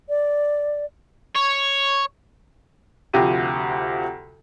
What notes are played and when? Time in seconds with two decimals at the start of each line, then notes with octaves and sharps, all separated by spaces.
0.09 D5
1.35 C#5
3.14 D2 C3 F3 F#4 G4 D#7